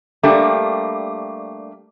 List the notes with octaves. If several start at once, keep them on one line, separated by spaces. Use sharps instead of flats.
G3 A3 A#3 D4 G4